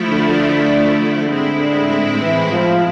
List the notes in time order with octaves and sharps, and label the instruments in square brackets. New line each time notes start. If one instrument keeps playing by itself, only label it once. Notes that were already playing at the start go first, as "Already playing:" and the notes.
Already playing: [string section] F3 A3 E4
[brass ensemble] D3
[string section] A2 G#3 C4 E4
[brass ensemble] E3
F3